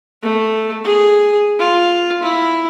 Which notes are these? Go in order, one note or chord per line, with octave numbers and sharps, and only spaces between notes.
A3
G#4
F4
E4